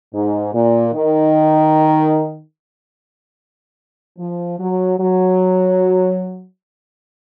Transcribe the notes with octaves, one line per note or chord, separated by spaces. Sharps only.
G#2
A#2
D#3
F3
F#3
F#3